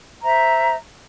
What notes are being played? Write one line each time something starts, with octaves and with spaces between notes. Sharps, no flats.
C5 E5 A#5